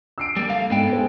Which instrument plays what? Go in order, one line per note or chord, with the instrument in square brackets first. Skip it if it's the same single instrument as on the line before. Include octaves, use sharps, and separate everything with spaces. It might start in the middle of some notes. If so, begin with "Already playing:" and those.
[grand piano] E6 C7 D7
[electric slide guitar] G3 A#3
[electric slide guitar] A3 F5 [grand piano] A6
[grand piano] G#2 [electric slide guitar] B3 A4 G5
[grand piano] G#4 C5